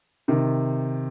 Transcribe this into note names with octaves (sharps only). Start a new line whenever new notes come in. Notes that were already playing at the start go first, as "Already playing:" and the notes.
C3 D#3